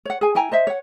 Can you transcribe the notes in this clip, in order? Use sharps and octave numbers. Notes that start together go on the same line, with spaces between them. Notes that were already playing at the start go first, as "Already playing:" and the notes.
C#5 F#5
G#4 G#5
E4 G5 G#5 A#5
C5 D#5 E5
C#5 F#5